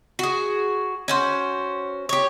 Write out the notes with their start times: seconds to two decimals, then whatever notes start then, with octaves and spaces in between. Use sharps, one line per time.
0.19 F#4 G#4
1.08 C#4 F#4 C5
2.09 G4 C#5